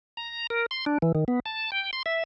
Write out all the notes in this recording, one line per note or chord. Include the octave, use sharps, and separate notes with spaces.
A#5
A#4
C6
D4
E3
D#3
B3
A5
G5
C6
E5